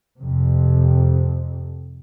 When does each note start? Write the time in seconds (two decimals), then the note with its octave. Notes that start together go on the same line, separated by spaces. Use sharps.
0.21 F2 C3